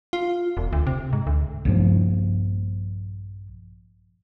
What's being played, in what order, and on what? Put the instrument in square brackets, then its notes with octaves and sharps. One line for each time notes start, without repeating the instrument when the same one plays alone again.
[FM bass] F4
E1
D2
C3
G#2
D2
[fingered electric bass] A#1 G2 F3